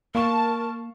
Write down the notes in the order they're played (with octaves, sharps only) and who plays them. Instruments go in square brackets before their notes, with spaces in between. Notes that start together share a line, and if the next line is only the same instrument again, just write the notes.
[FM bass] A#3 [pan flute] A#4 [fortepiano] F5 C#6 [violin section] A5